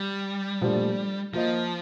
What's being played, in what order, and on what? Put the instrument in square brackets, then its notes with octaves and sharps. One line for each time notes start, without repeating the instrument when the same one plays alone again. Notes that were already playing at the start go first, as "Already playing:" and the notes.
Already playing: [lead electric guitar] G3
[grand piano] A#2 F3 A3 D4 G4
[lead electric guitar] F3 [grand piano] A#3 F4 C5 D#5